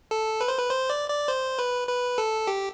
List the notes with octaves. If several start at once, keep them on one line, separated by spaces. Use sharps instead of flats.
A4
B4
C5
B4
C5
D5
D5
C5
B4
B4
A4
G4